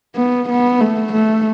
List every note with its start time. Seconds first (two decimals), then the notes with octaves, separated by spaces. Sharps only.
0.16 B3
0.49 B3
0.81 A3
1.13 A3